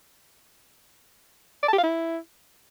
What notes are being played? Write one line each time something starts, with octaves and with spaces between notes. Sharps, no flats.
D5
A5
G4
F5
E4